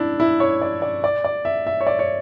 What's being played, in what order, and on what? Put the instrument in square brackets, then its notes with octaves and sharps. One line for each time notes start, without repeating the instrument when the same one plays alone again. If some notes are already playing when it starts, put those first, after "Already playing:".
Already playing: [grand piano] D4 E4
E4
C#5
D5
D5
D5
D5
E5
E5
C#5
D5
C#5